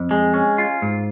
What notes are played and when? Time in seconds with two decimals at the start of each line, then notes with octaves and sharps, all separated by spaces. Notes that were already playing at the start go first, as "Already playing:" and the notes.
Already playing: F2
0.11 G#3
0.34 C#4
0.58 F4
0.82 G#2